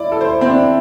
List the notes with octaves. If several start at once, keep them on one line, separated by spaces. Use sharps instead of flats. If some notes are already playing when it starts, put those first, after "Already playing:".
Already playing: E4 D5
A4
C5
C4
D4